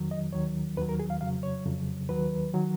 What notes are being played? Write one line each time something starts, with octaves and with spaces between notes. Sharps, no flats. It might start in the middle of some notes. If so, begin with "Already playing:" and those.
Already playing: F2 D#3 F#3
D#5
D#2 D#3 F#3 C#5
D#2 D#3 F#3 B4
A#4
G#4
F5
F2 C#3 F#3 F5
C#5
F2 C#3 F#3
D#2 D#3 F#3 B4
D#3 F#3